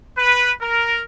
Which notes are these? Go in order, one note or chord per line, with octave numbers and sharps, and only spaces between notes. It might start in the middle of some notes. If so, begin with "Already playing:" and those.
B4
A#4